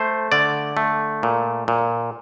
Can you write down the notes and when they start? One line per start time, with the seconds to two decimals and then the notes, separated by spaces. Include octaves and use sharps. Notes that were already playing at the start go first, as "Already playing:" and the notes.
Already playing: A3 C5
0.32 D3 D5
0.77 A3
1.23 A#2
1.68 A#2